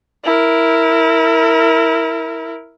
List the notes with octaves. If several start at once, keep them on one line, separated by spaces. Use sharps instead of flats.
E4 A#4